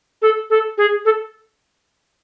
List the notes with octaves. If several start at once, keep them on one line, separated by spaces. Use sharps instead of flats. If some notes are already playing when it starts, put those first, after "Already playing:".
A4
A4
G#4
A4